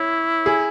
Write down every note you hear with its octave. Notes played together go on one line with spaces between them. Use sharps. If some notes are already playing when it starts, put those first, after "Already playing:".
Already playing: E4 C#5
G#4